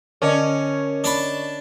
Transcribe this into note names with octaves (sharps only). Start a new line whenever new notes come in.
D3 C#4 A#4 D5 D#5 C#6
D4 A5 B5